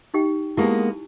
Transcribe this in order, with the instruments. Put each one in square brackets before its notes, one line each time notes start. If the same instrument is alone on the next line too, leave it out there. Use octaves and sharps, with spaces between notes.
[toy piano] D#4 G4 G5
[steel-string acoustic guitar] G#3 A#3 B3 [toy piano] E4 G4 G#5